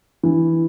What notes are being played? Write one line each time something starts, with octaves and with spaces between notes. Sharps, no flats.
E3